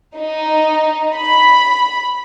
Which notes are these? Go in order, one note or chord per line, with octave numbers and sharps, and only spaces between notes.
D#4
B5